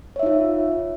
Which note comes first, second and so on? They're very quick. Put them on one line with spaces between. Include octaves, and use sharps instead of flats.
C#5 E5 D#4 F4